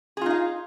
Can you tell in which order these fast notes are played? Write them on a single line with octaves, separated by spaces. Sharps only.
G#4 F4 D#4 F5